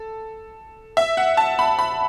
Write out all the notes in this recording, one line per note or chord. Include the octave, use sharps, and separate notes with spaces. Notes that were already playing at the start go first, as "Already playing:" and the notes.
Already playing: A4
E5
F#5
A5
B5
B5